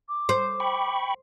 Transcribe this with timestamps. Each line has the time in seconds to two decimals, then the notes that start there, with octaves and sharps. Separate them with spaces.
0.09 D6
0.29 C5
0.60 G5 B5 C#6